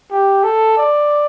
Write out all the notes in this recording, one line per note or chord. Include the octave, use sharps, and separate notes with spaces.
G4
A4
D5